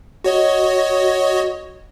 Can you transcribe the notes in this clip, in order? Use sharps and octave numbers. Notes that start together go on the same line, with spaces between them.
F#4 C#5 D#5